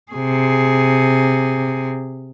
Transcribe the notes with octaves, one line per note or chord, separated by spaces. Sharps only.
C3 G#4